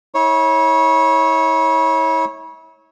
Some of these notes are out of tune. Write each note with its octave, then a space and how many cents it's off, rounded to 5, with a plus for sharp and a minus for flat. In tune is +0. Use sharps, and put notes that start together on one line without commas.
E4 -40 C#5 -15